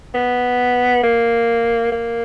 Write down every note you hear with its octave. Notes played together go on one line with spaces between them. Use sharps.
B3
A#3
A#3